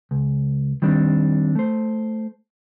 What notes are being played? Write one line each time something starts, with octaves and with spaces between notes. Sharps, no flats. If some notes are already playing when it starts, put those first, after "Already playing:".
C#2
D#3 G3 C4 D4
A3 C5